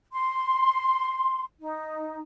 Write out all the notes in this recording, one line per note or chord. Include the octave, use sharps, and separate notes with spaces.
C6
D#4